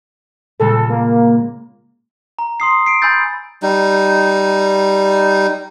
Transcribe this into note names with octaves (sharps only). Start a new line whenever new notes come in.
A#2 C#3 G#3 A4
A#3
A#5
C6 D#6 C7
C7 D7
G#5 B5 E6 G6 A6
G3 D#4